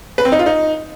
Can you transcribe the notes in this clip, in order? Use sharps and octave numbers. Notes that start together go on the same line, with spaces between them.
B4
C4
D#4
F4
D#4